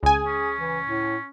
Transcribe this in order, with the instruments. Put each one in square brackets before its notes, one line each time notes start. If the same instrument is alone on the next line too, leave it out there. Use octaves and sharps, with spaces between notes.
[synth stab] C#2 G#5 [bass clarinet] G#4
[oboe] C#4
[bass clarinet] E3
A2